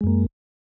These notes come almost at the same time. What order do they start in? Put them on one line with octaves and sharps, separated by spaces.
G#3 F#2 A#3